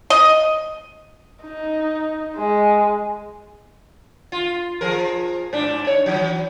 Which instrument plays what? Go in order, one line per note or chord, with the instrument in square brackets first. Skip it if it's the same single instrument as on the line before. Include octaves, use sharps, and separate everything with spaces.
[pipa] D#5
[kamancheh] D#4
G#3
[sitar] F4
F3 G#4 A#4
G#2 D4
D#4 C#5
E3 F#3